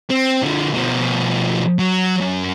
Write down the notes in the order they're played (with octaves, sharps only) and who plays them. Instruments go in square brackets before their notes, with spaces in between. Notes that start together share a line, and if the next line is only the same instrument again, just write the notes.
[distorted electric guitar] C4
D3 F3
B2 F3
F#3
F#2